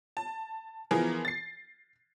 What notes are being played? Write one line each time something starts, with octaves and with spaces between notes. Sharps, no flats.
A5
E3 F3 B3 G#4 A#4
A6 C7